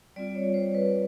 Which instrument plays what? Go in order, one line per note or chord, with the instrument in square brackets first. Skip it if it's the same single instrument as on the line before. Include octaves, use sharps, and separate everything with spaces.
[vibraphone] G3 C4 F4 D5
C#5
C5
B4